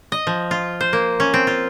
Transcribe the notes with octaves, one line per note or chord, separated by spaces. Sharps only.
D#5
F3
F4
C5
A#3
C#4
C4
F4